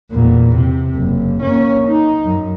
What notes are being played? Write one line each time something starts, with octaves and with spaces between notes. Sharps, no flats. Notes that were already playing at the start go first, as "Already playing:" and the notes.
E2 A#2
C3
F#1
A#3 C#4
D#4
F#2